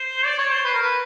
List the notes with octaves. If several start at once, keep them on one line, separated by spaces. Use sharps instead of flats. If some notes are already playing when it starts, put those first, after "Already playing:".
Already playing: C5
D5
C#5
C5
B4
A#4
B4